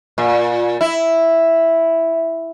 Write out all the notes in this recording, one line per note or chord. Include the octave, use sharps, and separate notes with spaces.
A#2
E4